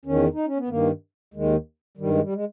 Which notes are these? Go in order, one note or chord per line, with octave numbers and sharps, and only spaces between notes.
E2 D#3 C#4
D#4
C#4
B3
G2 D#3 A#3
D#2 D#3 G#3
G2 D#3 G3
G#3
G3
G#3